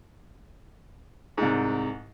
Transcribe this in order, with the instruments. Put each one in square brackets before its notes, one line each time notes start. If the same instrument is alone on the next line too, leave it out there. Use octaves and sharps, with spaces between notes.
[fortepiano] C2 G#2